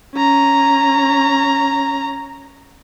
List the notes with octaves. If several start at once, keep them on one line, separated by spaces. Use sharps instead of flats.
C#4 A#5